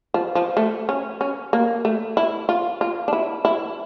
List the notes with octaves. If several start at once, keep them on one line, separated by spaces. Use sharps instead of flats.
F3
F3
A3
C#4
C#4
A#3
A3
E4
F4
F4
D4
E4
E4